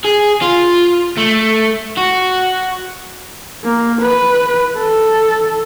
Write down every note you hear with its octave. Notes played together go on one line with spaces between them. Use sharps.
G#4
F4
A3
F#4
A#3
B4
A4